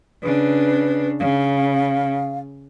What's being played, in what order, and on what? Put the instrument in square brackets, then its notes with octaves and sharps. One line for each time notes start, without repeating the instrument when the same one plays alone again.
[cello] C#3 D4 [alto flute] B4
[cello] C#3 [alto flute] F5